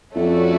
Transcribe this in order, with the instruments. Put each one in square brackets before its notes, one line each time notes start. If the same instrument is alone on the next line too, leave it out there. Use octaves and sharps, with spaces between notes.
[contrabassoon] F2 [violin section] A3 C#4 F#4 A4 D5